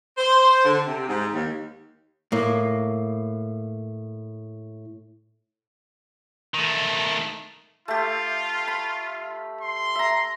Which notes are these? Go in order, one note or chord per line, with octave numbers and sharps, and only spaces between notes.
C5
D3
C3
G#2
D#2
A2 A#3
D#3 A3
A3 F4 G4
B5
C6
E5 A#5